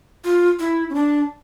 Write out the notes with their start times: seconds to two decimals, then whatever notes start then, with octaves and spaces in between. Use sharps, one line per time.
0.24 F4
0.60 E4
0.90 C#4
0.95 D4